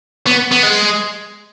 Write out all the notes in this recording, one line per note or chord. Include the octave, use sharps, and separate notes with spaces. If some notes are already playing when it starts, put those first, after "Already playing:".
B3
B3
G#3